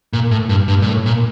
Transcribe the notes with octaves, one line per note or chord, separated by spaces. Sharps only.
A#2
A2
G2
G2
A#2
A2
A#2